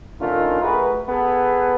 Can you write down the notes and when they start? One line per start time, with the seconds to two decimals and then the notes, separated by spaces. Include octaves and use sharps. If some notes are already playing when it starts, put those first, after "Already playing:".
0.20 D3 A3 C#4 D#4 F4 A#4
0.62 A3 F#4 G#4 A#4 B4
1.08 B3 G#4 A4 B4